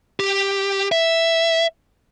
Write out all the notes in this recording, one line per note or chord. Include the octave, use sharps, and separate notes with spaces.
G4
E5